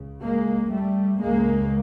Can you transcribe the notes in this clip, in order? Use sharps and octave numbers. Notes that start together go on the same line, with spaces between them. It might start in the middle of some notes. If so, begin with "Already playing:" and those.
Already playing: C#2 C#3
G#3 A#3
G3 A3
C#2 C#3 G#3 A#3